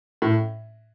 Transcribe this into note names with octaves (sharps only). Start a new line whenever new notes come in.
A2